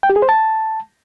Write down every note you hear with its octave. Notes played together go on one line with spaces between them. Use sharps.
G5
G4
G#4
C5
A5